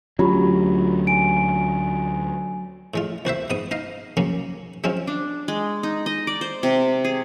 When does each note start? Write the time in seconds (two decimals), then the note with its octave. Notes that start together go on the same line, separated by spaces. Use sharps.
0.19 D2 F#3 C#4 F4 G4 B5
1.07 G#5 D7
2.94 A2 G#3 F4
3.25 C2 F#4 C5 E5
3.50 G#2 B3 D#6
3.71 D#4 D#5 F5
4.17 C#3 F#3 A#3 C#4
4.84 F#3 G#3 C4 C#4 F4
5.07 D4
5.48 G#3
5.83 D#4
6.06 D#5
6.27 D5
6.41 C5
6.63 C3
7.05 G#4